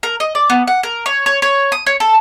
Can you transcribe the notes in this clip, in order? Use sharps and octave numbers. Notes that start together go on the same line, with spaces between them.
A#4
D#5
D5
B3
F#5
A#4
C#5
C#5
C#5
D#6
C#5
A4